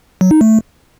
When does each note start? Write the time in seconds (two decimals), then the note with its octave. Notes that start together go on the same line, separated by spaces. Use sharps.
0.21 F#3
0.31 D#4
0.41 A3